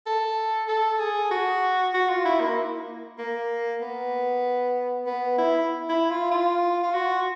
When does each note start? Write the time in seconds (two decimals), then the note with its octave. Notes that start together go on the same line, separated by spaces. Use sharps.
0.06 A4
0.68 A4
0.99 G#4
1.31 F#4
1.94 F#4
2.09 F4
2.25 E4
2.40 A#3
3.19 A#3
3.81 B3
5.06 B3
5.38 E4
5.89 E4
6.11 F4
6.31 F4
6.83 F4
6.94 F#4